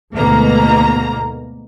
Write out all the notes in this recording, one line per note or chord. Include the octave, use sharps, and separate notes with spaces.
D2 G#2 B2 A#3 A#5